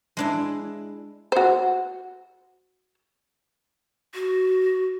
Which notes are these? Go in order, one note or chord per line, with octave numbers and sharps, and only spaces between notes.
G#3 D4 E4
F#4 C5
F#4